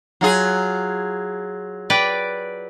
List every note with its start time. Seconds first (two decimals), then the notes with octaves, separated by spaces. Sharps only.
0.21 F#3 F4 G#4
1.90 B4 D5 G5